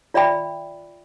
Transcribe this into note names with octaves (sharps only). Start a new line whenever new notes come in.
F4 D5 E5 G5 B5